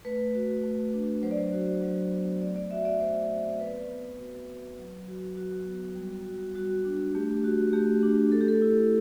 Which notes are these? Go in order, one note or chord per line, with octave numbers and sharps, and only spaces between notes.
A3 B4
F#4
A3
D4
F#3 C5
D5
C5
F#4
F#3
B3
A3 D5
D5
F#4 E5
D5
A3 C5
C4
B3 B4
B3
F#4
F#4
F#3
F#4
F#3 F#4
B3
G3
F#4
G3 F#4
D4
A3 G4
F#4
A3 G4
D4
A3 A4
G4
A4
E4